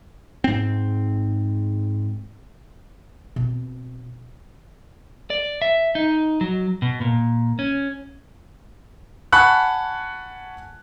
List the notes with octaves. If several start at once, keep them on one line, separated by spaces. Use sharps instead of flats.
G#2 C4
B2 C4
D5
E5
D#4
F#3
B2
A#2
C#4
F#5 G#5 A5 B5 C#6 F#6